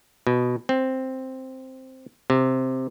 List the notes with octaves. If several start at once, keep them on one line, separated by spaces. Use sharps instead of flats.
B2
C4
C3